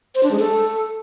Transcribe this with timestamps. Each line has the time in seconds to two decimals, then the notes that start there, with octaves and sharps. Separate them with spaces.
0.15 C5
0.23 D4
0.31 G#3
0.40 A4